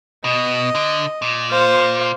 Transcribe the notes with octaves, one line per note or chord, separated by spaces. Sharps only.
B2 D#5
D3
A#2
C5 F5